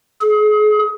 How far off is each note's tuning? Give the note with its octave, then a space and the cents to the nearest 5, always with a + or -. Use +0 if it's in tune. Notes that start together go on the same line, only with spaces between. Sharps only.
G#4 +35